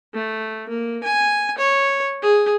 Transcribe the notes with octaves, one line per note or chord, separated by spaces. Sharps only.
A3
A#3
G#5
C#5
G#4